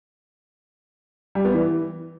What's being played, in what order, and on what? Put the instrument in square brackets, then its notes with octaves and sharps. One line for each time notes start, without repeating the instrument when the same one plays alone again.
[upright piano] G3
B3
E3